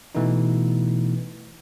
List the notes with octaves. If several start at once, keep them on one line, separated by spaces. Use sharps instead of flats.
B2 E3 A3 B3 D#4